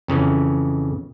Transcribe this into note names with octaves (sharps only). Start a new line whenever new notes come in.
F2 C#3 E3 C#4